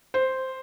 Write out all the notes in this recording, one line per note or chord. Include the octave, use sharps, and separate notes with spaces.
C5